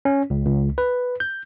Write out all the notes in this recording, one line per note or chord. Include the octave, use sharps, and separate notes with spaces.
C#4
C#2
C#2
B4
G6